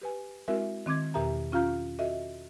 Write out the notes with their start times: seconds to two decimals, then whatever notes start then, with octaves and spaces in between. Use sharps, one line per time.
0.01 G4 B4 G#5
0.48 G#3 C4 E4 F#4 A#4 E5
0.86 D#3 C4 D6 G#6
1.14 E2 B2 G4 A#4 E5 A#5
1.52 C#4 F4 F5 A#5 G6
1.99 F#4 A4 D#5 E5